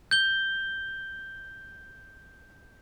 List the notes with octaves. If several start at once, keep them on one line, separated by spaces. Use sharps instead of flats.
G6 G7